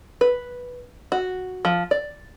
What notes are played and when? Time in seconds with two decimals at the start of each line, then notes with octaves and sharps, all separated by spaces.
0.21 B4
1.12 F#4
1.65 F3
1.91 D5